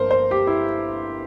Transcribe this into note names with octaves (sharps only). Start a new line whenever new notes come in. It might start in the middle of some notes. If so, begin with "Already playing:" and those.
Already playing: G1 G2 F3 A#3 A#4 C5
C5
G4
E4